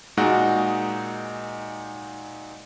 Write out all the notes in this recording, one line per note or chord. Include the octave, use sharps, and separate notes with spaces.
A#2 G#3 D#4 F#4 F#6